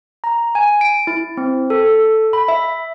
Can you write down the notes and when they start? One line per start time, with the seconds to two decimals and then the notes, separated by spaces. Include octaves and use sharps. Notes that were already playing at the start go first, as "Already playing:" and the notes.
0.24 A#5
0.55 G#5
0.81 D7
1.07 E4
1.37 C4
1.70 A4
2.33 B5
2.48 E5